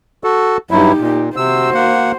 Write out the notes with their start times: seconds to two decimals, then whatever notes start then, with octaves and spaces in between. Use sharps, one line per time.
0.24 F#4 A4
0.71 G2 F#3 D#4 E4 G4
1.00 A#2
1.37 C3 F#4 C5 E6
1.74 A#3 F#5